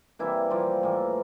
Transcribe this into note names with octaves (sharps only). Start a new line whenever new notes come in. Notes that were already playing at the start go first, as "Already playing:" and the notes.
C3 E3 G3 A#3 E4
C3 F3 G3 A#3 F4
A2 E3 A#3